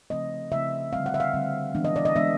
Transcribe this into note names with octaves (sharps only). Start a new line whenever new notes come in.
C#3 F3 A3 C4 D#5
C#3 F3 A3 C4 E5
D3 G3 C4 F5
F#5
E5
F5
D3 G3 C4
E3 G#3 B3 D4
D#5
D5
D#5
E3 G#3 B3 D4 E5